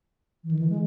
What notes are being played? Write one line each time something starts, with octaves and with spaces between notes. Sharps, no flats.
E3
D#3
E3
G#3